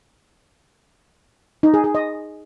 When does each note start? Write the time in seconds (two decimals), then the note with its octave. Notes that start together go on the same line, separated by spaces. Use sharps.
1.63 D#4
1.74 G#4
1.84 G#4
1.95 D#5